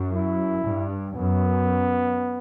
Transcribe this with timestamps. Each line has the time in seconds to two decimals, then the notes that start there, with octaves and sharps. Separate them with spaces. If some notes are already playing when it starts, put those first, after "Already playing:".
Already playing: F#2
0.12 E4
0.64 G2
1.16 F#2 B3